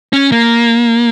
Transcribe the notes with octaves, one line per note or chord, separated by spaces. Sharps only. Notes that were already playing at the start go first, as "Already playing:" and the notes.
C#4
A#3